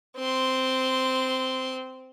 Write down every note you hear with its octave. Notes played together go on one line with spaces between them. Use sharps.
C4 C6